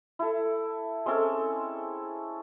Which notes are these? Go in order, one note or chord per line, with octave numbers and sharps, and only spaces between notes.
E4 A4
G#3 C4 C#4 A4